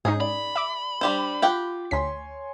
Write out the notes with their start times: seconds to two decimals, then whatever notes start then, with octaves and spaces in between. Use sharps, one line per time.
0.05 G#2 C#4 D#4 G#4
0.21 D5 B5
0.56 E5 D6
1.01 G3 D4 G4 C5
1.42 F4 G4 F#5 G5
1.91 D2 C#5 G#5 C6 B6